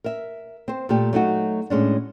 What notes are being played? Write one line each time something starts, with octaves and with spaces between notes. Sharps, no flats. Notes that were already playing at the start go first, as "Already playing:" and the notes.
A#4 E5
C4 C5
A#2 A3 G4
F#3 A3 D#4 F#4
A2 G#3 C#4 D4